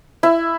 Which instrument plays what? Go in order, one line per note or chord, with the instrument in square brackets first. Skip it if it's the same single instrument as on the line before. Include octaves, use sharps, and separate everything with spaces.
[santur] E4